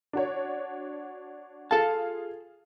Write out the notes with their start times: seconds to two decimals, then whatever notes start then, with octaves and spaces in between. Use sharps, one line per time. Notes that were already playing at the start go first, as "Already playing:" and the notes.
0.13 D4 F#4 C#5
1.71 F4 G#4 A4 F5 A5